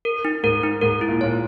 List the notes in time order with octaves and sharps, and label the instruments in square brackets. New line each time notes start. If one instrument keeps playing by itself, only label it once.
[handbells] A#4
D#4
[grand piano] G#2 [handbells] A#4
[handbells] D#4
[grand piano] G#2 [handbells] A#4
[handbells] E4
[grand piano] A#2
[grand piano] A#2 [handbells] C#5